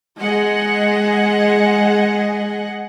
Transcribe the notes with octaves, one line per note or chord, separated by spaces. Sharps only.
G#3 G#4 D#5 F#5